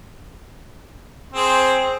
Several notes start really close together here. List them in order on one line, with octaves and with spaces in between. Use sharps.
C4 G#4 C5